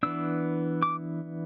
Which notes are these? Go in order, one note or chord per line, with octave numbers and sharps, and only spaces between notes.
E3 B3 D4 E6
D6